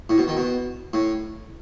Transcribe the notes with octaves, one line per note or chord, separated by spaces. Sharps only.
A2
B2
D#3
B2
A2